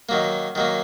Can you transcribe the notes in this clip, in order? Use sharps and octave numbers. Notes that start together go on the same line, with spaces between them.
D#3 F#3 A#3
D#3 F#3 A#3